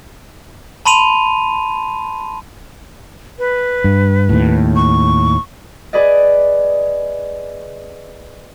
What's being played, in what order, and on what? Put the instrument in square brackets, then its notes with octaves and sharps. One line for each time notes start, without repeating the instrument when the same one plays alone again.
[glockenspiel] A5 B5 C6 D#7 F7
[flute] B4
[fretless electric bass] G2
D#2 A2
[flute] C#6
[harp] G#4 B4 D5 D#5